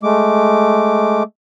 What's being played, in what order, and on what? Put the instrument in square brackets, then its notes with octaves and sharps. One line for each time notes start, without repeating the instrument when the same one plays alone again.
[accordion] G#3 A3 D6